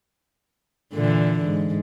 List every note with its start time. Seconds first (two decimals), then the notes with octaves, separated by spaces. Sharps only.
0.94 A#2 D3 E3
1.45 G#2